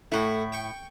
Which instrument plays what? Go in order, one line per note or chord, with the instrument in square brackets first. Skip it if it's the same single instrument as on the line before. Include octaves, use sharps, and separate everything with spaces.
[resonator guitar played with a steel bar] A2 E4 [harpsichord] A3 F#5
[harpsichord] G5 C#6